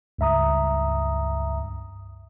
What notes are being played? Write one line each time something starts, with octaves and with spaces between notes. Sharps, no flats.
C#2 G2 E5 A#5 D#6